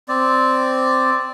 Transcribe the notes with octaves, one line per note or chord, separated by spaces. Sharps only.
C4 D5